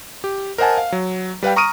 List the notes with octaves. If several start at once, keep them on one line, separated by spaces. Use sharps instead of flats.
G4
A#4 C5 D#5 F#5 G#5 A5
F5
F#3
G3 B4 F5 G5
A#5 C#6 D#6 F6 D7 D#7